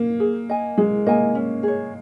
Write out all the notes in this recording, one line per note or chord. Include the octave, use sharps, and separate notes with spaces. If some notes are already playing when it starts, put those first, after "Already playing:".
Already playing: A#3
G#4
D#5 G#5
G#3 G#4
A#3 D#5 G#5
C#4
G#4 C#5